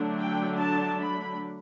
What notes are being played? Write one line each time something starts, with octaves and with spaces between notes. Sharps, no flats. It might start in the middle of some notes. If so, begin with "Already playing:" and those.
Already playing: D3 F#3 A3 D4
G5
A5
B5